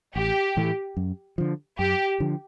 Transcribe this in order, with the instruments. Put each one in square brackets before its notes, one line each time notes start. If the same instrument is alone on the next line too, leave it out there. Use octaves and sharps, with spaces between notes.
[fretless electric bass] A1 [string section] G4
[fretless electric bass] A2 E3 A3
F#2
D3 F3
[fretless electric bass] F#2 [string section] G4
[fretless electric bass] D3 F3